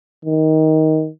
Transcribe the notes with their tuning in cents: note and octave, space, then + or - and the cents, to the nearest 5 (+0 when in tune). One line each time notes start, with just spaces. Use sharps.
D#3 +15